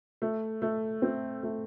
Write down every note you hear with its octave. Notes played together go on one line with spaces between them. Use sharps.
A3
A3
C4
A3